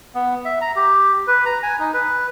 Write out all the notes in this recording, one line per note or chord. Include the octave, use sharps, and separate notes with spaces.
B3
E5
A#5
G4
B4
A#5
G#5
D#4
B4